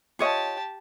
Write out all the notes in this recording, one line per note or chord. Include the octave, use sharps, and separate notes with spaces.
F4 G4 C#5 D#5 A5